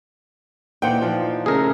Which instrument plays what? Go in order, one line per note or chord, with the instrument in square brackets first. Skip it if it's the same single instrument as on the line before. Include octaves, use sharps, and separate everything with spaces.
[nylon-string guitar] A#2 E3 D#4 [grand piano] C5 F#5 G5
[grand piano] F3
[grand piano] C#3 A3 C#4 [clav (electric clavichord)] G#4 A#4